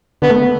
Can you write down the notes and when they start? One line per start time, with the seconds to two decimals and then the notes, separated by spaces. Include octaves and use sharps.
0.22 D3 B3
0.30 A3
0.36 B3